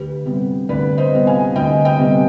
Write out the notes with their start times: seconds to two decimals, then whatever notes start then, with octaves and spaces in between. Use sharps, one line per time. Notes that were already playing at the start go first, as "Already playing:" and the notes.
Already playing: D2 G4 B4
0.25 C3 G3 B3
0.69 D2 B4 D5
0.98 C5 D#5
1.13 C3 G3 B3
1.27 F5 G#5
1.56 D2 D#5 G5
1.85 D#5 G5
1.99 C3 G3 B3